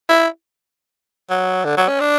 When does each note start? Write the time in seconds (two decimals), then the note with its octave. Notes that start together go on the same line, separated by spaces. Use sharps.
0.09 E4
1.30 F#3
1.65 D3
1.77 F#3
1.88 C#4
2.00 D4